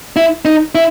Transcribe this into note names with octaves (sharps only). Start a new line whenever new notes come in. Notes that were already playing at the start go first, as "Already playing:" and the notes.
E4
D#4
E4